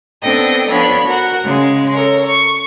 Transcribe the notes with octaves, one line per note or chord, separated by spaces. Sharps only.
B3 C4 D4 A4 D#5 G5
F3 B3 D4 C#5 B5
F#4 A#4 F#5
C#3 G#3
A4 A#4 C#5
C#6